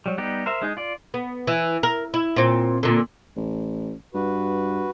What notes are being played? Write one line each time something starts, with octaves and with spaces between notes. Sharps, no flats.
F#3 G3
G3 B3 D#4 G4
A#4 C5 E5
G#3 D#4 G#4
F4 D5
B3
E3
A#4
E4
A#2 C4
A#2 D3
A1
G2 F#4 B4